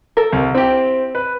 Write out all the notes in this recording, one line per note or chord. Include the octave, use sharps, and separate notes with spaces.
A4 A#4
C2
C4 E4 G4 G5
B4